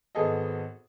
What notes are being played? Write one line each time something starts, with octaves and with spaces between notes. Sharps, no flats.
G#1 B3 G#4 A4 D#5